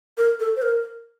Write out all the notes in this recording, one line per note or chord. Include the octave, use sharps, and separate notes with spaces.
A#4
A4
C5
A#4